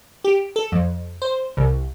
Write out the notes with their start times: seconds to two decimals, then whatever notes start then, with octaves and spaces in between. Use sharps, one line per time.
0.24 G4
0.56 A4
0.72 F2
1.22 C5
1.57 C2